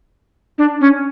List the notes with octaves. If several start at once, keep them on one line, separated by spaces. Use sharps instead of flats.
D4
C#4